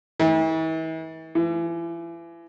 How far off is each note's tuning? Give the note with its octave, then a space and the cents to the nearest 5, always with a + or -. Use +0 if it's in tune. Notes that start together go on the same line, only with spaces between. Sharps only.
E3 -40
E3 +35